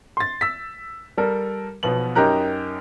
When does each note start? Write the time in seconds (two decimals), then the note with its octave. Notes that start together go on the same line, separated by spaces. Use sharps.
0.17 C6 A6
0.41 E6 B6
1.18 G3 A4 A#4
1.83 B1 B2 F3 B3 F#7
2.15 F#2 D#4 G4 A#4 A#5 F#6